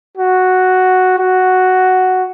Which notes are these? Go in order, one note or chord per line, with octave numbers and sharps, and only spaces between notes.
F#4
F#4